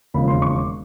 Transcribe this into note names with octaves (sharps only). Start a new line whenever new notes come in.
E1 D#2 C#3 F3 B5
C6
C#6
D6